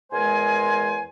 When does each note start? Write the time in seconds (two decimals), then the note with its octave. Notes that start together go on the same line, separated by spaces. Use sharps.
0.12 E2 G#3 A#4 C5 G#5